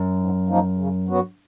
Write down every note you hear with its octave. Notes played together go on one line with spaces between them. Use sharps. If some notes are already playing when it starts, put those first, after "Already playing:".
Already playing: F#2
G#2
F3 A#3 D#4
C#3
F#3 B3 F#4